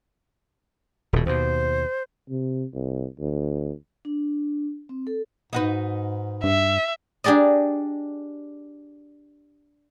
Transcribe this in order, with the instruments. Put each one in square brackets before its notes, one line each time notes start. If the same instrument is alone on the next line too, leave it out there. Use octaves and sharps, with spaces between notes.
[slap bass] D#1 B2
[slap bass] D#2 B2 [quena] C5
[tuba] C3
C2
D2
[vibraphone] D4
C4
A4
[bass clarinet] G#2 [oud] D#4 F#4 B4
[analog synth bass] G2 [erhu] E5
[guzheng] D4 G4 G#4 D5 D#5